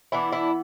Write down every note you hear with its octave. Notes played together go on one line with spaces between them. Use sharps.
E3 B3 D4 E4
E4